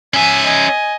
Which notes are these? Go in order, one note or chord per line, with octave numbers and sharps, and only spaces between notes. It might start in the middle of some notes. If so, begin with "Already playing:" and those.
C#4 E5 G#5 D#7
D#5 G#5